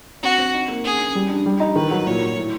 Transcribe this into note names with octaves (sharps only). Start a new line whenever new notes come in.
C4 F#4
C4
D#4
A#3
C#4 G#4
C#4
G3
D4
G3
D#4
D#3 B4
F#3
A#2 C#5
F#3
A2